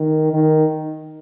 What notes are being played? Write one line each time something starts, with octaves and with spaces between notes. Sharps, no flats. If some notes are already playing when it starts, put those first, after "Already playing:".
Already playing: D#3
D#3